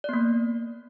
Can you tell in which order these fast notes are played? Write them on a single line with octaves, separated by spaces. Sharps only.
D5 B3 A#3